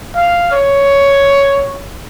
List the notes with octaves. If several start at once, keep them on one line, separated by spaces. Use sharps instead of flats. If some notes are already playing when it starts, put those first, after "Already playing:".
F5
C#5